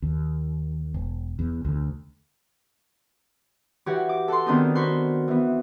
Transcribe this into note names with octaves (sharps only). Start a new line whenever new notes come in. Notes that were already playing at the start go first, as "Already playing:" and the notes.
D#2
E1
E2
D2
E3 F#4 G4 C#5 F#5
D6
A4 F#5 C6
D#3 B3 C4 D4 D#4
F#4 C5 B5 C6 F#6
E3 B3